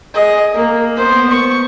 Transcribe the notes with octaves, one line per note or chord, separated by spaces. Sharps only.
G#4 D#5
A#3
B3 C5
C#6